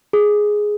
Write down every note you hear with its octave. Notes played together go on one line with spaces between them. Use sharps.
G#4